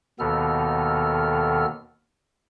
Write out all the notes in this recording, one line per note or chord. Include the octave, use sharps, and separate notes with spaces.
D#2 B2 D#3 B3 A4 F6